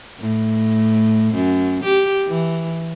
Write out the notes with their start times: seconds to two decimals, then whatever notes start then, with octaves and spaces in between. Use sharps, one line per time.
0.19 A2
1.34 F#2
1.84 G4
2.27 E3